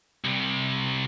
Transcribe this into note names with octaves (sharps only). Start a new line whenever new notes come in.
C2 C3